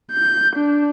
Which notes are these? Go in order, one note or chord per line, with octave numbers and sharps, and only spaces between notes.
G6
D4